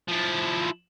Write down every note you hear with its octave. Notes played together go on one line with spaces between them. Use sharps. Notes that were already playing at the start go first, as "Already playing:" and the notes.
F3 E4